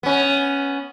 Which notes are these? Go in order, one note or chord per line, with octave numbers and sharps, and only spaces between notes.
B3 C#4